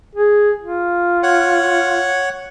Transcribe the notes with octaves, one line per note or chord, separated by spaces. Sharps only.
G#4
F4
C#5 F#5